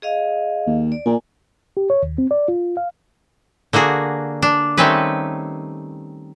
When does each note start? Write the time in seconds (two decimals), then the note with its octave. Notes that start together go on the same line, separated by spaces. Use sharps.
0.02 G#4 D#5 F5
0.67 D#2
0.92 D5
1.06 A#2 G#5
1.77 G4
1.90 C#5
2.03 D#2
2.18 C4
2.31 D5
2.48 F4
2.77 F5
3.73 D3 A#3 F#4 G#4
4.42 D4
4.77 D#3 G3 A3 C4 C#4 B4